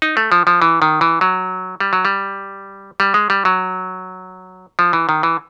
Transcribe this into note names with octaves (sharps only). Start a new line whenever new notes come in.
D#4
A3
F3
F3
E3
D#3
E3
F#3
G3
F#3
G3
G3
G#3
G3
F#3
F3
E3
D#3
E3